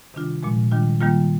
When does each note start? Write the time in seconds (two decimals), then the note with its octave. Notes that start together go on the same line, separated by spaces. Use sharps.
0.14 C3 D#3 G3 D4 F4
0.43 A#2 F3 G#3
0.71 D#3 G3 D4 F4
1.01 D#3 G3 A#3 F4